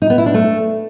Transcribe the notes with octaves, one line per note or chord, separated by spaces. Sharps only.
D#4
B3
E4
D4
A3